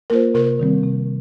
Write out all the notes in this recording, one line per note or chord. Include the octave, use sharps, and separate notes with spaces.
A#3 F4 A#4 C5
C3 A#4
D#3 G3 C4
C3